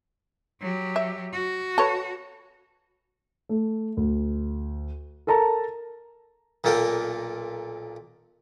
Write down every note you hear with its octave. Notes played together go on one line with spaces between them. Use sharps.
F#3 G4
E5
F#4
A4 B4 C#5
A3
D2
A4 A#4 A5 A#5
B1 A#2 A#3 A4 A#4 G5